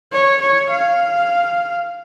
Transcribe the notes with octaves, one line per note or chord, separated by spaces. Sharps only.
C#5
C#5
F5